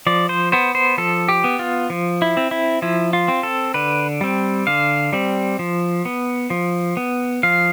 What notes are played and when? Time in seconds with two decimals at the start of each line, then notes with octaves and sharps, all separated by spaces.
0.07 F3 D5
0.29 C5
0.52 B3 C5
0.75 C5
0.98 F3 A4
1.29 G4
1.44 B3
1.59 F4
1.90 F3
2.22 E4
2.37 C4
2.51 E4
2.82 F3 E4
3.13 F4
3.28 C4
3.43 A4
3.74 D3 B4
4.21 G3 C4
4.67 D3 F5
5.13 G3 C4
5.59 F3
6.05 B3
6.50 F3
6.97 B3
7.43 F3 F5